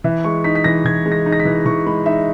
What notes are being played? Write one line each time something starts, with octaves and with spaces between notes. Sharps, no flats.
E3 E5
G#3 C#6
D#4 B6
B6
E3 A#6
E3 G#6
G#3
A#6
D#4
A#6
B6
E3
E3 C#6
G#3 B5
D#4 E5